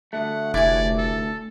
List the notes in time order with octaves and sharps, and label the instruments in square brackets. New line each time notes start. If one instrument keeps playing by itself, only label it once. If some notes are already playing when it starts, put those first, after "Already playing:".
[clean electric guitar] D2 A3 [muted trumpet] F#5
[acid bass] F1 [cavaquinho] E4 G#5 [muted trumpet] D5
[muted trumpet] A4